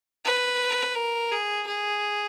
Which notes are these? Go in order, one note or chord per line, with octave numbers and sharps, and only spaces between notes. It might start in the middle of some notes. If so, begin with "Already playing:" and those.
B4
A#4
G#4
G#4